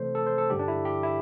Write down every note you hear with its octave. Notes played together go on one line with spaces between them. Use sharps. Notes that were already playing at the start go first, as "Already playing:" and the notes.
Already playing: C3 E3 A3 C4 A4 C5
A4
C5
A4
G2 D3 G3 G4
D4
E4
G4
E4